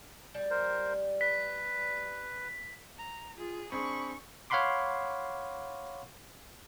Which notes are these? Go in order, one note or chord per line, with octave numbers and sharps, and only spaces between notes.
G3
A#4 C5
B4 B6
A#5
F4 G#4
C4 D4 G#4 B5 C#6
C#5 F5 F#5 B5 C6 D6